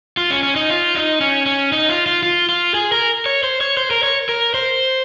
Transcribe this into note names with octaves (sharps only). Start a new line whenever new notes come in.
F4
C#4
C#4
D#4
F4
D#4
C#4
C#4
D#4
F4
F4
F4
F4
G#4
A#4
C#5
C5
C#5
C5
A#4
C#5
A#4
C5